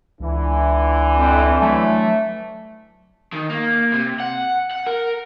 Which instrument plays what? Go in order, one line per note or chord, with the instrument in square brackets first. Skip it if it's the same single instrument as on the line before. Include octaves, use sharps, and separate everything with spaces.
[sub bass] C#2 [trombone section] D3 E3
[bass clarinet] F2
[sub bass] F#3 [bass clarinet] A3
[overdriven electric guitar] D#3
A#3
C3
F#5
F#5
A#4